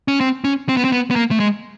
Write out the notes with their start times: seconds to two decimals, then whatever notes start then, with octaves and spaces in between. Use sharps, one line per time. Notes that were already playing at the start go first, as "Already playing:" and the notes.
0.08 C#4
0.21 C4
0.44 C#4
0.69 C4
0.77 B3
0.84 C4
0.92 B3
1.11 B3
1.16 A#3
1.31 A3
1.40 G#3